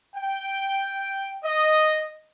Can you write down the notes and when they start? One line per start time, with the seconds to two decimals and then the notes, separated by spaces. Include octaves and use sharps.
0.16 G5
1.44 D#5